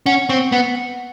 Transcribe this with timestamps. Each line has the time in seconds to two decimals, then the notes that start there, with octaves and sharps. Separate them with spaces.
0.06 C#4 F#5
0.29 C4 C#6
0.52 B3 F#5
0.75 F#5